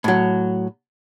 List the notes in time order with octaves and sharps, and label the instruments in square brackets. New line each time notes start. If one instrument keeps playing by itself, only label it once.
[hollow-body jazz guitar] A2 F#3